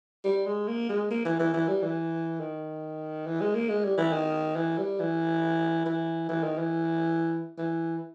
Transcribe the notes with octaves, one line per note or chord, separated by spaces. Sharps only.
G3
G#3
A#3
G#3
A#3
E3
E3
E3
G3
E3
D#3
E3
G#3
A#3
G#3
G3
E3
D#3
E3
G3
E3
E3
E3
D#3
E3
E3